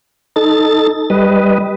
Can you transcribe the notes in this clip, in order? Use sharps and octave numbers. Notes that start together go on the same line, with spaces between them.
D#4 A4 A6
G3 B4 D#5